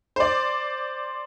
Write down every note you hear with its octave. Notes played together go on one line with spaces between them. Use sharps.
C5 D5